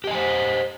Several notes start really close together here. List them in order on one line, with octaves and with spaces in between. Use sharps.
G4 D#5 G#5 C5